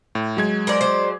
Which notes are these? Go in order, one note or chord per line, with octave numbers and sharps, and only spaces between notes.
A2
F#3 G#3 G#6
A#4 C5 D5
C5 D5